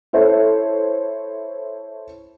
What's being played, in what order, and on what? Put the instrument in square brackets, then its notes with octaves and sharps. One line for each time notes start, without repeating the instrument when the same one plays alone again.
[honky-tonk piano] E4 A4 C5 C#5